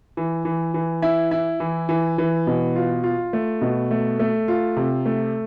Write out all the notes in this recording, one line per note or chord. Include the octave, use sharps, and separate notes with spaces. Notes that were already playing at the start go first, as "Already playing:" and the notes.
E3
E3
E3
E4
E4
E3
E3
E3
B2
F4
F4
A3
B2
A3
A3
F4
C3
A3